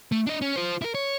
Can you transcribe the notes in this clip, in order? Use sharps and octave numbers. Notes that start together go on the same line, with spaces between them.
A3
D4 D#5
C#4
F4 C5
E4 A#4
C#5